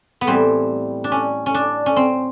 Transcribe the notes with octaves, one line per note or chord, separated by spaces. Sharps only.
B3
A2 E3 G3 C4
D4
C#4
C#4
D4
C#4
C4